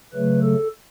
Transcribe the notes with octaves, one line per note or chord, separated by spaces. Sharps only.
C#3 F#3 A3 B4
A4